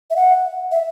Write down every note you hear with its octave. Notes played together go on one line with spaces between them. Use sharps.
E5
F#5
E5